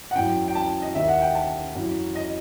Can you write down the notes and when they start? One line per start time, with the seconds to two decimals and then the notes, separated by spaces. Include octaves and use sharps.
0.11 F#5
0.15 F#2 E3 G5
0.48 G5
0.55 A5
0.82 D#5
0.95 D#2 D#3 E5
1.08 F#5
1.21 G5
1.35 A5
1.75 F#2 E3
2.15 D#5